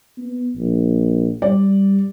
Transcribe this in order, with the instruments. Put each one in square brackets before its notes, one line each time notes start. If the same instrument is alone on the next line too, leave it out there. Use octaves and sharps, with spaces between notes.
[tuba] B3
A#1
[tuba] G3 [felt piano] D5